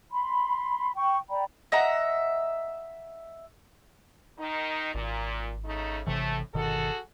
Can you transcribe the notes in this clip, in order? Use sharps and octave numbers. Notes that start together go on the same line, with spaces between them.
B5 C6
G5 C#6
D5 G5 A#5 B5
D#5 E5 F#5 A#5
D#3 D#4
G#1 A#2
C#3 A3 D#4
G#1 A2 C3 E3 A3
G1 B2 D#3 F#4 G#4 A4